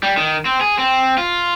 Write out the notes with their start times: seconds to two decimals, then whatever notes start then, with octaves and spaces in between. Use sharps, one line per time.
0.03 G3
0.17 D#3
0.45 C4
0.61 G#4
0.78 C4
1.18 F4